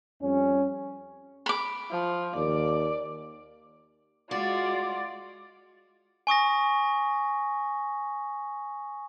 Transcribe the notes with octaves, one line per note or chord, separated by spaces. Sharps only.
F2 G3 C#4
B5 D6
F3
D#2 D5
G#3 F4 F#4 D5
G#5 C#6 D#6 A#6